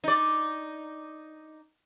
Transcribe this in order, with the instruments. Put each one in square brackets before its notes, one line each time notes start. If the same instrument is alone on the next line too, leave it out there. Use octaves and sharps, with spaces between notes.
[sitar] D#4 D5